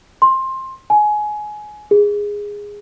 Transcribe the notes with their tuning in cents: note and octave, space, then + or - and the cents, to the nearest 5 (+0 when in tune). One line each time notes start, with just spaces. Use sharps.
C6 +15
G#5 +20
G#4 -15